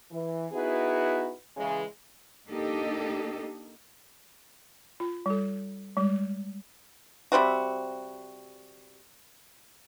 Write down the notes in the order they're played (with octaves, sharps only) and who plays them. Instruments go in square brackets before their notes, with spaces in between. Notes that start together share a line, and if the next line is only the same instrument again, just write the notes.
[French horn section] E3
B3 D#4 E4 F#4 G#4 B4
C#3 E3 G#3
[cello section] A#3 D4 D#4 G4 A4 D#5
[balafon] F4
G3 A4
G3 G#3
[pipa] C3 G3 C4 F#4